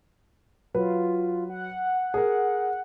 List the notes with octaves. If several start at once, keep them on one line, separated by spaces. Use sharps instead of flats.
F#3 F4 B4
F#5
G#4 A#4